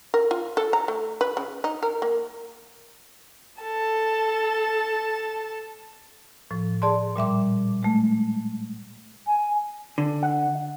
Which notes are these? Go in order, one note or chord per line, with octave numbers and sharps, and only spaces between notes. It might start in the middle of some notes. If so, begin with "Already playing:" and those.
A#4
F4
A4
A#5
A3
B4
C#3
D#4
A#4
A#3
A4 A5
A2 F3
G#4 D5 A5 C6
A#2 G3 E5 D6
G#3 A3
G#5
D3
F#5